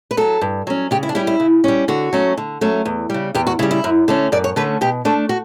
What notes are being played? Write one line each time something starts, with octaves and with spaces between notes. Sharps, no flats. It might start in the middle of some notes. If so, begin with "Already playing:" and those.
B4
F#3 C#4 A4
G2
F#3 C#4
C#3 G4
E4
D4
G3 C#4 E4
E4
C#3
G3 C#4
D3 F#4
F#3 A3 C#4
D3
F#3 A3 C#4
E2
C#3 G3
E2 G4
F#4
C#3 G3 E4
E4
F#2
D3 A3 C#4
F#2 D5
C#5
D3 A3 C#4 B4
B2 G4
A3 D4 A4
F#4